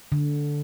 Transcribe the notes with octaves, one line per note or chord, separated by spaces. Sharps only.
D3